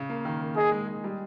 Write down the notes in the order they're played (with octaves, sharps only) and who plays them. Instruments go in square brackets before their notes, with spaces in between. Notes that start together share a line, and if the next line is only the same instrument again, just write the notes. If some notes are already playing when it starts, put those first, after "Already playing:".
Already playing: [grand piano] C#3
A#3
D#3
A#3
[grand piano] D#4 [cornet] G#4
[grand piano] G#3
G#3
G3